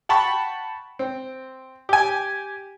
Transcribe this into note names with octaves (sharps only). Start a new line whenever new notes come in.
F#5 G5 A5 B5 C#6
C4
G4 G#5